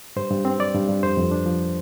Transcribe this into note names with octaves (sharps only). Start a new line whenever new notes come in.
G2 C5
G2
C4
G3 D5
G2
G2
F2 C5
F2
D4
F3